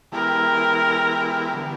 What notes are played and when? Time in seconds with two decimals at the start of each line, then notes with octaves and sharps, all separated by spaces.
0.12 E3 G#3 B3 E4 G4 A#4
1.54 D3 G3 B3